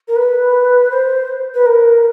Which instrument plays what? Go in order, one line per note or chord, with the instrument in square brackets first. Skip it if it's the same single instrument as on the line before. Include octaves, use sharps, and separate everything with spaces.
[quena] A#4
B4
C5
B4
A#4